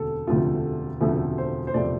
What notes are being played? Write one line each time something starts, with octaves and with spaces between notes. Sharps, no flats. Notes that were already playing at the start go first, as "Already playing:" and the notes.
Already playing: E1 D2 C3 A4
E1 D2 C3 F3 A3 F4
E1 D2 C3 F3 A3 E5
C5
C5
E1 C3 F3 A3 D5